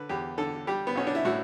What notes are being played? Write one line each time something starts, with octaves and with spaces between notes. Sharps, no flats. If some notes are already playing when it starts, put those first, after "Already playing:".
Already playing: D3 B4
E2 G4
D3 A4
G3 G4
B3
B1 C#4
D4
E4
A2 F#4